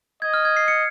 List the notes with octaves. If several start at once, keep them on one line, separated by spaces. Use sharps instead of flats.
D#5 G#6
F6
G#6
C7
C#7